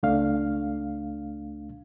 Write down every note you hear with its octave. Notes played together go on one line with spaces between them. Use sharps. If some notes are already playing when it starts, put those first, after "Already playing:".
C#2 A3 D4 F5